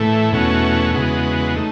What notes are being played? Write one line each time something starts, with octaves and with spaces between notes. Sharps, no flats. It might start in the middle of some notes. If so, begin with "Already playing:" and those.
Already playing: A2 E3 A3
E2 B2 A3 C#4 F#4
E2 C#3 G#3 B3 F#4
A3 D#4